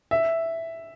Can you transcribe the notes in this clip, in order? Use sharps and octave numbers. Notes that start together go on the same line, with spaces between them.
E5